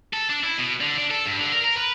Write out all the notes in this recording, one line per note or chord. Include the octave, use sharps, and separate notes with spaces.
A4
D4
E4
B2
D3
D4
A4
G2
D3
A#4
A#4
B4